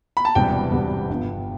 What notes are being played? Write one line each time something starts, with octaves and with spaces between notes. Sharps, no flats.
B5
A5
E1 E2 C3 G3 B3 G5
E1 E2 C3 G3 B3
G1 G2 F3 B3